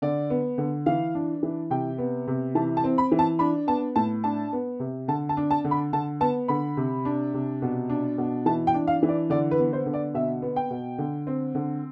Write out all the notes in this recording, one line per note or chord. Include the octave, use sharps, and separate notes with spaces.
D3 D5
B3
D3
E3 F5
D4
E3
C3 G5
B3
C3
E3 A5
A5
C4
B5
E3
A5
D4 B5
B3 A5
A2 A5
D4 A5
B3
C3
D3 A5
A5
D4
A5
D3
B5
D3 A5
B3 A5
D3 B5
C3
D4
C3
B2
D4
B2
E3 A5
G5
D4
F5
E3
D5
D3 D5
B4
B3
C5
D3
D5
B2 E5
B3
G5
B2
D3
C4
D3